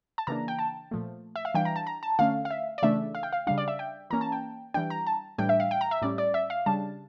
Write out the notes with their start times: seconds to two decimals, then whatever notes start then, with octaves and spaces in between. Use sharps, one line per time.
0.18 A5
0.27 C#3 E3 A#3 D4 A#5
0.48 G5
0.59 A5
0.91 A#2 F3 A3
1.36 E5
1.45 F5
1.54 E3 G3 D4 G5
1.65 A#5
1.76 A5
1.87 A#5
2.03 A5
2.19 D3 A3 C#4 F5
2.45 F5
2.51 E5
2.78 D5
2.83 C#3 E3 A3 D4 E5
3.15 F5
3.23 G5
3.33 F5
3.47 C#3 G3 D4 F5
3.58 D5
3.68 E5
3.79 G5
4.10 E3 A#3 C#4 A#5
4.21 A5
4.32 G5
4.74 E3 G3 D4 G5
4.90 A#5
5.07 A5
5.38 A2 E3 G3 D4 G5
5.49 E5
5.60 F5
5.71 G5
5.81 A#5
5.91 E5
6.02 A2 G3 C#4 D5
6.18 D5
6.34 E5
6.50 F5
6.66 C#3 G3 D4 A5